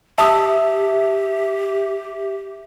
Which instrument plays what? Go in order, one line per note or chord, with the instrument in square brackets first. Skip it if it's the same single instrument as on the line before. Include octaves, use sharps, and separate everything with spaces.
[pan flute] G4 [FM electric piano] E5 [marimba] A5 D#6 E6